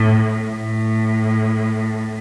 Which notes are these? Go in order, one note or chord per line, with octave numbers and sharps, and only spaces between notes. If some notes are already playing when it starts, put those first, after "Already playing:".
Already playing: A2
A2